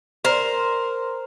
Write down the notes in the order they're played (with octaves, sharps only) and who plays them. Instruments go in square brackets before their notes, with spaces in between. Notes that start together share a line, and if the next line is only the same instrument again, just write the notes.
[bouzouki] A#4 C5